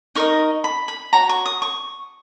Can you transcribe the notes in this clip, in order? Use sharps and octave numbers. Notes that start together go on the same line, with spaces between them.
D#4 A#4 D#5 C#6
B5
B5
F#4 C#5 A#5
C#6
D#6
C#6